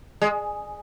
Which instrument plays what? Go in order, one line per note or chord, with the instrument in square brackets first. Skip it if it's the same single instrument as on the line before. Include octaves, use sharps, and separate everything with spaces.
[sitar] G#3